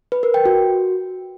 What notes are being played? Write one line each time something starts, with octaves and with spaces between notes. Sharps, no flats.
B4
A#4
G5
F#4